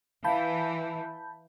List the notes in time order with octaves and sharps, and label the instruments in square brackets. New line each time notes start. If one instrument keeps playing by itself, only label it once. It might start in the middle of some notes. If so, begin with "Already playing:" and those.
[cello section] E3 [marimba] F5 [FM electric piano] A5 B5 G6